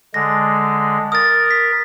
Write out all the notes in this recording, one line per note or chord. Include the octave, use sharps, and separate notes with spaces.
D3 G#3 A#6
A#4 D#6 A6
B6